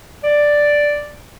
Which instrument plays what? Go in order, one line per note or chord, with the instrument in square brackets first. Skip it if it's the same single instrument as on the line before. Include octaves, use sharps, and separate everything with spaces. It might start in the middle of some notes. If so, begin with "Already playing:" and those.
[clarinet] D5